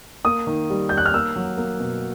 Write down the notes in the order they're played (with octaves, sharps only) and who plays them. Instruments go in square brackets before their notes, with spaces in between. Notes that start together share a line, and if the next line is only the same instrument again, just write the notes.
[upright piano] A#3 D#6
D#3
G3
G3 G6
F#6
F6
A#3 E6
F#3
A#3
B2